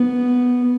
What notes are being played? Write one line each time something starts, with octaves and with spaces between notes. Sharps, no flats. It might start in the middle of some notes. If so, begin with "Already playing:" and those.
Already playing: B3